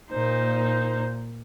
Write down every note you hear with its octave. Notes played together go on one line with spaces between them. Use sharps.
A#2 D#4 C5